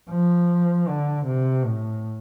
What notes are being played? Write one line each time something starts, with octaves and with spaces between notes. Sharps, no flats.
F3
D3
C3
A2